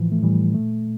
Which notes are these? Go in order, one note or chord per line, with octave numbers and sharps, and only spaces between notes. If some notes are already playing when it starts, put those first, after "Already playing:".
Already playing: A2 E3 F3
A3
A2 E3 G3
A#2 A3